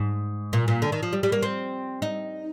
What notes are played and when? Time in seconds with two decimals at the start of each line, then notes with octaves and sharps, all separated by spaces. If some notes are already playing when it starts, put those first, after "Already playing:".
Already playing: G#2
0.53 A#2
0.68 A#2
0.82 D3
0.92 D#3
1.03 F3
1.13 G3
1.23 G3
1.32 A#3
1.43 C4
2.02 D#4